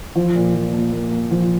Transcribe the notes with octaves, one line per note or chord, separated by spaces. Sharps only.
F3
A#2
F3
A#3
A#3
A#3
F3